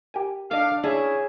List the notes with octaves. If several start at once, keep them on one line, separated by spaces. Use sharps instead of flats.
G4 A#4 G#5
D4 A4 D#5 F5 D6
C#4 D4 E4 G#4